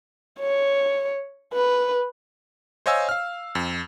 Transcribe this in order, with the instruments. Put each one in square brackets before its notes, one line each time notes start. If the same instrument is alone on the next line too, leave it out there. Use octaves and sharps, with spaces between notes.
[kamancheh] C#5
B4
[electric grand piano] C5 C#5 D#5 F5 G#5 E6
F5 F6
F2